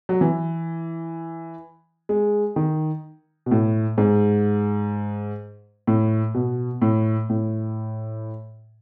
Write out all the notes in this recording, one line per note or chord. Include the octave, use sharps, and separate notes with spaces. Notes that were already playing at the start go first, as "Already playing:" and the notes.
F#3
E3
G#3
D#3
B2
A2
G#2
A2
B2
A2
A2